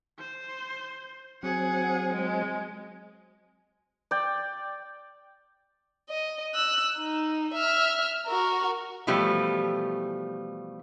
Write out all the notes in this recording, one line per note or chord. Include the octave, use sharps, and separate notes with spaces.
C5
F#3 C4 G#4 F#5
G#3
D5 G5
D#5
E6 F#6
D#4
E5 F6
F#4 A#4
B2 E3 F3 G3 A3